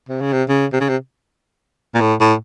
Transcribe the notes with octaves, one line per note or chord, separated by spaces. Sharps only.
C3
C#3
C3
C#3
C3
C#3
C3
A#2
A2
A2